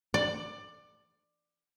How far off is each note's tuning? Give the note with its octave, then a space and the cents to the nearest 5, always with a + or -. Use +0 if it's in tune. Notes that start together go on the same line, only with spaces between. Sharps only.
D5 +20